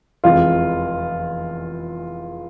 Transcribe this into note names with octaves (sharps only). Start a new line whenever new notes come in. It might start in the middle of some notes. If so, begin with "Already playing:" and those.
F1 E2 C3 E3 G#3 F4